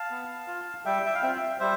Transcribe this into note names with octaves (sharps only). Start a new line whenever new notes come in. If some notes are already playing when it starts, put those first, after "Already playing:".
Already playing: F5 A5
B3
F4
G3 E5 G5
E5
F5
C4 F4 E5 G5
G3 C5 E5